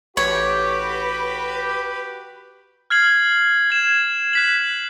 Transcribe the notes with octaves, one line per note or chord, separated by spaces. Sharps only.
A1 F#4 G4 B4 C#5
F6 G#6 C7 F#7
G#6 E7
F#6 B6 F#7